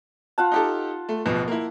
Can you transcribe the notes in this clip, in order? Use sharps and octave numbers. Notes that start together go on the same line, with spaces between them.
F4 F#5 A5
D#4 G4 A4
A3
D1 B2 F3
A#3 E4